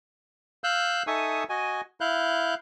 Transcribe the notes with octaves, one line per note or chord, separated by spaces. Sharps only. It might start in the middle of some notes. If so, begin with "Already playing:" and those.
F5 E6 F#6 G6
D#4 A4 E5 G#5 C#6 D#6
F#4 D#5 G#5
E4 F5 F#6 G6